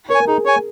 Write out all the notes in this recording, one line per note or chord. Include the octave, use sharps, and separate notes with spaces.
A#4 C#5
G#5
A#4
D#4 G#4
C#5 G#5